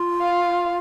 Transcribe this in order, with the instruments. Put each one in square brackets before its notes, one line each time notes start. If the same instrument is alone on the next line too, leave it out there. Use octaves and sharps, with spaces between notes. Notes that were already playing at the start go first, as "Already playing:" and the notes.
Already playing: [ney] F4
[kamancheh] F5